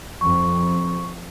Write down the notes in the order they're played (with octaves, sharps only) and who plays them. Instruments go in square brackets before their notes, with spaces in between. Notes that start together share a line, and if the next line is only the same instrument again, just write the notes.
[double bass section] F2 [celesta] C#6